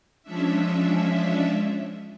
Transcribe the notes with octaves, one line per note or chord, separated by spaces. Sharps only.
F3 G#3 C#4 D4 E5